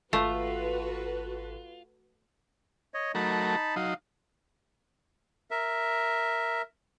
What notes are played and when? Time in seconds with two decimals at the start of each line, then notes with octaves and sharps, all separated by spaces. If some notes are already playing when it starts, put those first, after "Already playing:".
0.13 G#1 A3 F4 F#4 A4 B4
2.94 C#5 D#5
3.15 F#3 A3 D#4 A#4 A5 B5
3.76 F#3 D#4 F5
5.51 A#4 E5